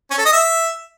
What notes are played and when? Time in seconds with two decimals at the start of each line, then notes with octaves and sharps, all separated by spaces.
0.11 C#4
0.18 A4
0.25 D#5
0.33 E5